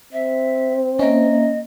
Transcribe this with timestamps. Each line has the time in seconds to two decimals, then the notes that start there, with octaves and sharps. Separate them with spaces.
0.13 C4 E5
0.99 A#3 C#4 D#5 E5